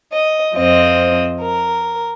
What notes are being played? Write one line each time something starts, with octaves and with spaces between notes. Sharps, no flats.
D#5
F2 F3 C4 D#5
A#4